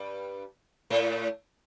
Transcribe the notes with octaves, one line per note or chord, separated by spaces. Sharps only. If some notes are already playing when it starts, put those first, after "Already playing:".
Already playing: G2 G3
A2 A3